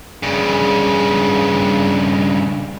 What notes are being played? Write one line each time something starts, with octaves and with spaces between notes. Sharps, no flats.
G2 C#3